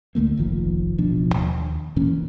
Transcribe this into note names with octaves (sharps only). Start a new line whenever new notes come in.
D2 D3 A3 A#3
F1 A#1 D#3 F3
D1 B2 F3 D4
D#2
D#2 A#2 E3 C#4